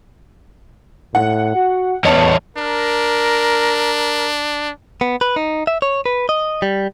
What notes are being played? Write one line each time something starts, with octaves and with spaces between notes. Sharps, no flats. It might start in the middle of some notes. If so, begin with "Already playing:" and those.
A2 F#5
F#4
E2 B3 C#4 D#5 A5
D4 A#4
B3
B4
D#4
E5
C#5
B4
D#5
G3